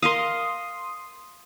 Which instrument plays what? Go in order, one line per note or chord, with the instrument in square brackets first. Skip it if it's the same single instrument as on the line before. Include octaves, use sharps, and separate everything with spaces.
[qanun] A#4 D#5 F5 [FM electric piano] C6 D#6